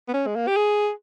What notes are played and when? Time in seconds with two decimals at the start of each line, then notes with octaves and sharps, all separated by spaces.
0.09 B3
0.13 C#4
0.26 G#3
0.35 A#3
0.47 G4
0.57 G#4